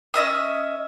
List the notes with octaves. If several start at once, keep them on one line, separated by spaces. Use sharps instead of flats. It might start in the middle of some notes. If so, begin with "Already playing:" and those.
C#4 D#5 E5 D#6